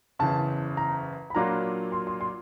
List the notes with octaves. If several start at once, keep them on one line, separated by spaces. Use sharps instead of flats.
F#1 E2 C#3 A5
A#5
B5
A#2 F#3 A#3 D4 F4 A#5
C6
C6
C6